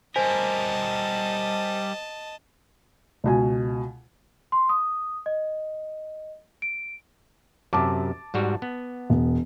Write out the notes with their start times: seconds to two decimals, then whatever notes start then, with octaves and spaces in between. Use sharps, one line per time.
0.16 G3 A#4 C5 D#5 G#5 A5 B6
3.24 C#2 B2 G#5
4.52 C6
4.69 D#6
5.26 D#5
6.62 D7
7.73 F#2 C3 A5 D6
8.34 G#2 G3 F#4
8.62 B3
9.10 E1